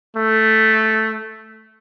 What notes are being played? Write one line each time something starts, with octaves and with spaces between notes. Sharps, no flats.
A3